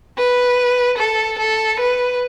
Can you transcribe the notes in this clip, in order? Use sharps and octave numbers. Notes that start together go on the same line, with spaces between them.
B4
A4
A4
B4